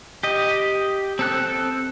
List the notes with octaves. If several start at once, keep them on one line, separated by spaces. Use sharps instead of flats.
G4 D#5
C4 A4 F#6